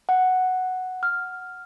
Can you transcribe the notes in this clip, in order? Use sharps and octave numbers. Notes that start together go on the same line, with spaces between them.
F#5
F6